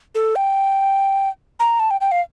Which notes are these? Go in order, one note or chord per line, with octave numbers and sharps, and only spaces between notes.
A4
G5
A#5
A5
G5
G5
F5